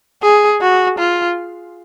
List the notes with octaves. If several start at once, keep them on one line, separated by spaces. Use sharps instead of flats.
G#4
F#4
F4